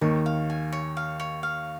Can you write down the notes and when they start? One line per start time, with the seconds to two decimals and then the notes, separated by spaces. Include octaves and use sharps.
0.01 D#2 D#3 C#5
0.26 F5
0.50 G#5
0.72 C#5
0.97 F5
1.20 C#5
1.43 F5